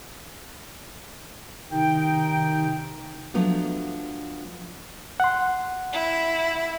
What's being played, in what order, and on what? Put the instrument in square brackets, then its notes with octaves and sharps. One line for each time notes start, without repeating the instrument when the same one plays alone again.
[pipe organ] C3 D#3 [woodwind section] D#4 G5
[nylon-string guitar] F3 F#3 A3 B3 D4
[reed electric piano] F#5 C6
[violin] E4